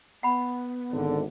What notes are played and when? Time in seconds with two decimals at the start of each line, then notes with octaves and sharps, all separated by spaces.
0.23 B3 F#5 B5
0.92 G#1 D3